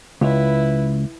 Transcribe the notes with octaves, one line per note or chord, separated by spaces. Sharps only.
C#2 E4 B4